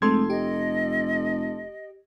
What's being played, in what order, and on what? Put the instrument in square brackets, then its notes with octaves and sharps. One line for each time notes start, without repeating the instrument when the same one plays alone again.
[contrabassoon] F1 [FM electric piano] G#3 A3 C4 [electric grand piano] A4 C6 G#6
[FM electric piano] G4 [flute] D#5